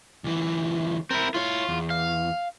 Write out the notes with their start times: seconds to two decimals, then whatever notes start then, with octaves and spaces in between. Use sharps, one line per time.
0.24 D2 E3
1.10 C4 E4 A#4
1.34 E4 F4 C#5
1.69 E2
1.90 F5